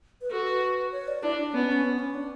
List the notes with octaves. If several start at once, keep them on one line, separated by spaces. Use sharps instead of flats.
B4
F#4 A4
B4
C#5
D5
D4 E4
D4
B3 C#4
C#4
B3
C#4
D4